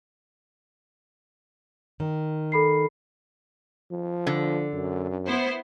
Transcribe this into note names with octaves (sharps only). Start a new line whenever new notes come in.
D#3
A4 B5 C7
F3
D3
F#2
B3 E4 C5